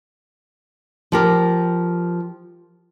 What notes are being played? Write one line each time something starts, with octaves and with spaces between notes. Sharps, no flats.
F3 G4 A#4